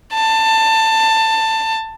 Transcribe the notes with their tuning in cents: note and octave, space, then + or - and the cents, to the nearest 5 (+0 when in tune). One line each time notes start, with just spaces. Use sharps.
A5 +20